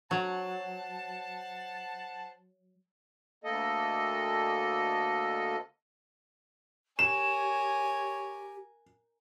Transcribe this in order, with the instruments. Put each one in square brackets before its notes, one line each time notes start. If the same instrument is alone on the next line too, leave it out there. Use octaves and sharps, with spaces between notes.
[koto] F#3 [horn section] C5 F#5 A5
[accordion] D2 A#3 A4 D#5
[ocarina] G4 [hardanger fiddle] A#4 G#5 [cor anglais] C#5 [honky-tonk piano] E7